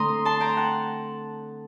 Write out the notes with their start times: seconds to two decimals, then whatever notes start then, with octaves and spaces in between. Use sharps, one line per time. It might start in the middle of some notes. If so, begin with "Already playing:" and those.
Already playing: D3 A3 C4 A#5 C6 D#6
0.25 A5 C6
0.40 G5 A#5
0.57 F#5 A5